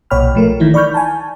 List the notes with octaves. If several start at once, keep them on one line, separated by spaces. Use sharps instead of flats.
B1 A#2 C#5 G5 B5 F6
F3 A3 A#4
D#3 E3 D#4 E4
D5 B5 C#6 F6 G6
G#5 A5